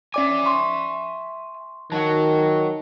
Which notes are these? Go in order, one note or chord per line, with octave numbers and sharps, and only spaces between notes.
C#4 D5 E5 G#5 D6
C6 C#6
D#3 F#3 F#4 C#5 A5